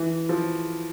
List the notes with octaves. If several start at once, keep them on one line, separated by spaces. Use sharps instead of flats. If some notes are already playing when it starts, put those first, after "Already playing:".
Already playing: E3
F3